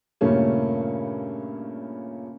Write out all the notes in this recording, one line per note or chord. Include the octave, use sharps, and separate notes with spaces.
G2 A#2 C#3 A3 A#3 C#4